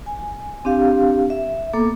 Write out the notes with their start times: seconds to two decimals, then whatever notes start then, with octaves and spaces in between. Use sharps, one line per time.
0.06 G#5
0.65 C4 D4 G4 F5
1.30 E5
1.73 A#3 B3 A4 D6